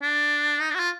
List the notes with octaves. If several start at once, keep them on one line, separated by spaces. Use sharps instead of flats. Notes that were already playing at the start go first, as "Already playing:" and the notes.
D4
D#4
D4
F#4
F4